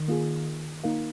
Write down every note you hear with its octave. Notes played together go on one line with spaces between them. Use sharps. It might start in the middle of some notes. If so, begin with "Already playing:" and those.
Already playing: D#3
A#3 F4 G#4
A#3 D#4 A#4 F5